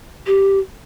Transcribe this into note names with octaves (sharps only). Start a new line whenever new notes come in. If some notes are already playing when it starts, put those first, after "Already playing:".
G4